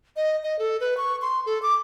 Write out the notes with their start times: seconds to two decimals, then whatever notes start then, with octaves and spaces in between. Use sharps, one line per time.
0.16 D#5
0.44 D#5
0.59 A4
0.80 B4
0.97 C#6
1.22 C6
1.46 A4
1.62 D6